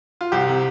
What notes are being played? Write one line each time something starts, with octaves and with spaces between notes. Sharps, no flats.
F4
C2 G4
C3